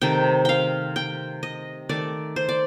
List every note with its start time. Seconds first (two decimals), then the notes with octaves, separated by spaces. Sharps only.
0.01 C3 D#3 A3 G5
0.45 F5 G5
0.96 G5
1.43 D#5
1.89 D#3 A3 D5
2.36 C5
2.49 D5